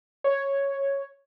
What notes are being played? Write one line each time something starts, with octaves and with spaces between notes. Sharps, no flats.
C#5